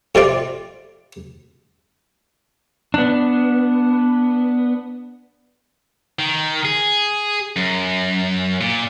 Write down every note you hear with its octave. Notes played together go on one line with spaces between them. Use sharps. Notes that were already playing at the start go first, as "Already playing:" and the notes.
F2 C3 D5 F5
B3 D4
D#3
G#4
F#2
A#2